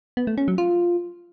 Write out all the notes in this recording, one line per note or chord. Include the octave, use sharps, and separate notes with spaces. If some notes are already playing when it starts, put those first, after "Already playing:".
B3
A3
C#4
F#3
F4